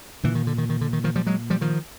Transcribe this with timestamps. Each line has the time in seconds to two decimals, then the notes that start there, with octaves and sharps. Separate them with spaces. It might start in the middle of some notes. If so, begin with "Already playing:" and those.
0.23 A#2 D3 E3
0.35 D#3
0.47 D3
0.58 D#3
0.70 D#3
0.81 D3
0.93 D#3
1.04 D#3 F3
1.16 F3 G3
1.26 F#3 G#3
1.50 F3 G3
1.61 D#3 F3